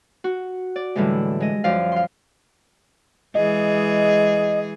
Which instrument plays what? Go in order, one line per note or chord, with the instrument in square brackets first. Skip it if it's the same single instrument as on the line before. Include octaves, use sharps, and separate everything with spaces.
[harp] F#4
D5
A2 D3 E3 G3 G#3
G#3 D#5
F#2 F3 D5 F5
F5 C6
[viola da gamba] E3 G#3 G#4 [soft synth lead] D#5